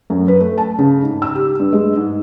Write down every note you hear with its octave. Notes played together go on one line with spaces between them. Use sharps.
F#2
B4
A3
A5
C#3
G#2
E6
G4
G2
G#3
G#2